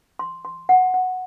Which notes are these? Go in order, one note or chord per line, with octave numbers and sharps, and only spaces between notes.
C6
C6
F#5
F#5